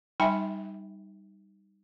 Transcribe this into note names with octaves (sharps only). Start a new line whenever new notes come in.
G3 D#4 E5 G5 G#5 B5